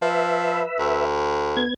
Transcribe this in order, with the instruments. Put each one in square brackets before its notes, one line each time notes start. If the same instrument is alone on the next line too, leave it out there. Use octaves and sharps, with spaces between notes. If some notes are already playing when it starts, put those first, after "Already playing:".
[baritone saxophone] F3 [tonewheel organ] B4 E5
[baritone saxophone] D2
[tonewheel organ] B3 G#6